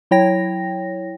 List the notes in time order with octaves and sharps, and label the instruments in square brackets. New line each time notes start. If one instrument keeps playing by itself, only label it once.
[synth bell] F#3 E4 C#5 G5 A#6